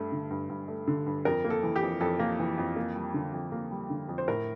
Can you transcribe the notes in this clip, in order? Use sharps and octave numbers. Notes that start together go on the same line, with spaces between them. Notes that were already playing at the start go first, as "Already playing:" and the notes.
Already playing: G2 A3
D3
G2
G2
A3
D3
G2
F2 A#4
A#3
A4
E3
G4
F2
F2 A4
A#3
E3
F2
A#3
G3
D3
F2
A#3
G3
D3
F2
C5
A2 A#4